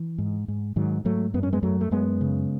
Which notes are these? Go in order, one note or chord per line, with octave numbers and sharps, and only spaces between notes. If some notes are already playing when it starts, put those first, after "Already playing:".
Already playing: E3
G#2
G#2
G#2 D#3 F#3
G#2 F#3 A3
F#2 B3
C#4
G#3 B3
F#2 F#3 A3
A3
F#2 G#3 B3
C#3